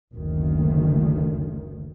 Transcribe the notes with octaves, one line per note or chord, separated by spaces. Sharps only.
F#1 D2 D#3